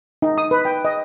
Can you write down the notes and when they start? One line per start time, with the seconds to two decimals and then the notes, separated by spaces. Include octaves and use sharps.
0.22 D#4
0.38 D#6
0.51 B4
0.65 G5
0.85 D#5